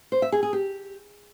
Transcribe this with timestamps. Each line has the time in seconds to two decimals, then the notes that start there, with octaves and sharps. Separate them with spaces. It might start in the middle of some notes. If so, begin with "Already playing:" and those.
0.12 C5
0.22 E5
0.32 G#4
0.43 G#4
0.53 G4